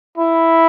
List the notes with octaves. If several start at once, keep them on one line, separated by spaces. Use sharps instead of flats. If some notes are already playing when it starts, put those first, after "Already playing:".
E4